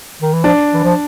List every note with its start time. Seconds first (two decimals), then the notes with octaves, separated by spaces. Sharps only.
0.22 D#3
0.33 E3
0.44 F3 D4
0.74 E3
0.84 F3